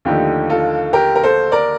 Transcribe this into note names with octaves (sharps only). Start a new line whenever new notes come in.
D#2 D3 F3 A3 D#4 G4
F4 A4
G4 A#4
A#4
A4 C5
A#4 D5